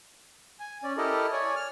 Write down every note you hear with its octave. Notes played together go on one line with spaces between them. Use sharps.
G#5
C#4 D5
E4 G4 A4 A#4 D#5
C#5 D5 G#5
F6